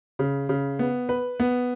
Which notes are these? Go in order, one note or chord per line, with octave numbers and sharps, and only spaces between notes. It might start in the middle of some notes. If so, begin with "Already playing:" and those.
C#3
C#3
B3
B4
B3